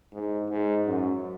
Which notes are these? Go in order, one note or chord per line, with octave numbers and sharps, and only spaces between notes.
G#2
G#2
F#2